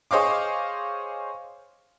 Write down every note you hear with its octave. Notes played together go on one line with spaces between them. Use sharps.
G#4 C5 C#5 D#5 F5 D6